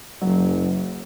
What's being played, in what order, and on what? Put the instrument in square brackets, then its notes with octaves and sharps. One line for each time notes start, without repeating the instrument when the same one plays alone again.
[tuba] F#1 [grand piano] F#3